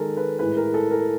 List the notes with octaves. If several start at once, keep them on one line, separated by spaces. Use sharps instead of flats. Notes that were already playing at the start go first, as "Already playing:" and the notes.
Already playing: D#3 G#3 A4 A#4
B4
A2 E3 G#3 B4
A#4
A4
A#4